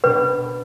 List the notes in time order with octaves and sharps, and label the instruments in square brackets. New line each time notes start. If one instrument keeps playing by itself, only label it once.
[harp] B2 B3 D4 [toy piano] B4